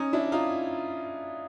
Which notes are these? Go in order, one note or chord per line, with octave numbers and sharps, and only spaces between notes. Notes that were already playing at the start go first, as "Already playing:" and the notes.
Already playing: C#4 D#4
D4 E4
D#4 F4